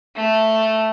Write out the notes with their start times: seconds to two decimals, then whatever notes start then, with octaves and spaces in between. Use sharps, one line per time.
0.16 A3